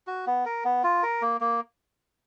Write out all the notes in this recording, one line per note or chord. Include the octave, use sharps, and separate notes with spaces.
F#4
B3
A#4
B3
F4
A#4
A#3
A#3